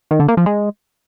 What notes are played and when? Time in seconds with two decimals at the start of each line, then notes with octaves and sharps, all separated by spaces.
0.11 D#3
0.20 D3
0.28 A#3
0.37 F3
0.46 G#3